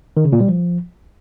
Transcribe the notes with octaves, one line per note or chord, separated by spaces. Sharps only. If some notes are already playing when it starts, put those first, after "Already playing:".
D#3
C#3
A#2
G3
F3